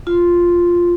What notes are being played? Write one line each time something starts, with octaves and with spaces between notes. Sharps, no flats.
F4